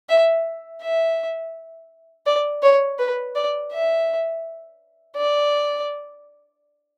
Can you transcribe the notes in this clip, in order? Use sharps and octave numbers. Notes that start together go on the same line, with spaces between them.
E5
E5
D5
C#5
B4
D5
E5
D5